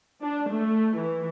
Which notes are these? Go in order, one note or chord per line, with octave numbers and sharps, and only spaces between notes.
D4
A3
E3